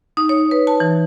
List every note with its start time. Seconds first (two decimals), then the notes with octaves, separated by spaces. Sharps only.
0.17 D#4
0.29 C#5
0.51 B4
0.67 A5
0.80 E3